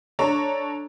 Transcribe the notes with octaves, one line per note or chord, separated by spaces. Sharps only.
D4 A4 C#5 A#5